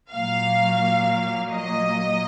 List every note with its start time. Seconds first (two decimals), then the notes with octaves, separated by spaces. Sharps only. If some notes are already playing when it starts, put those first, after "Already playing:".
0.11 A#2 F#3 A#3 F5
1.52 D#5